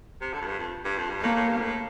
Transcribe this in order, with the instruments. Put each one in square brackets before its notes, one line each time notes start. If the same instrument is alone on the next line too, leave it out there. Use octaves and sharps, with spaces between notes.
[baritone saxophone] C3
D3
F2
G2
F2
G2
F2
G2
[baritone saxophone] A2 [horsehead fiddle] A#3
[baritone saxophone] A2
G2
A2